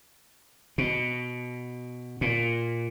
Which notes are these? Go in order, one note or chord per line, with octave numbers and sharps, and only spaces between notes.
B2
A#2